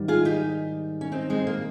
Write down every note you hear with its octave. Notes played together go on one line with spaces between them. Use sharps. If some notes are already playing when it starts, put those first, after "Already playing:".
Already playing: G#2 D#3 G3
F4 G#4
D#4 G4
C#4
C4 D#4
G#3 C4
A#3